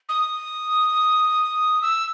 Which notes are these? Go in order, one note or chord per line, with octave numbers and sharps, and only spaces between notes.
D#6
E6